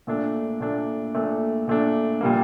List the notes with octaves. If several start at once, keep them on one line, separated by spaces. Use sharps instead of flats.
A#2 A3 D4
A#2 A3 D4
A#2 A3 D4
A#2 A3 D4
A#2 G3 A#3